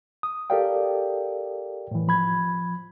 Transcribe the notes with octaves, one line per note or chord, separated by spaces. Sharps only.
D#6
G4 A4 A#4 D5 F5 G5
A2 E3
F3 B5 G#6